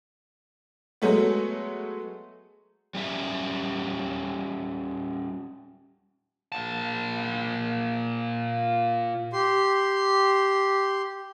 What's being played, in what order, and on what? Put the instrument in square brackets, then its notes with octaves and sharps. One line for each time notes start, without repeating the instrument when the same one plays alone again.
[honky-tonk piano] F#3 G#3 A3 B3
[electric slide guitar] G3 C#4 E5
[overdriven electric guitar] A#2 A5
[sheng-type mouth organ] G4 C6